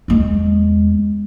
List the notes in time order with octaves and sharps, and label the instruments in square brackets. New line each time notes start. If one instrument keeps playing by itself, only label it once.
[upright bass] E2 G#3